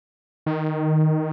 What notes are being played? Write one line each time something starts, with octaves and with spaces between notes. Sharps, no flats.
D#3